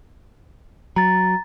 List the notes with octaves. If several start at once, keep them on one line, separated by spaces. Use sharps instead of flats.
F#3 A#5 A6